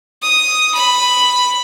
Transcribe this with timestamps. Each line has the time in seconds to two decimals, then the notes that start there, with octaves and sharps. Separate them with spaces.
0.22 D#6
0.75 B5